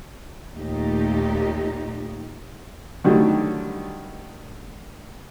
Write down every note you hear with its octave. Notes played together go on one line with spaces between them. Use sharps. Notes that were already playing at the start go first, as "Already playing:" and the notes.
D#2 A#2 A3 D#4 G4
D3 D#3 F#3 G3 A3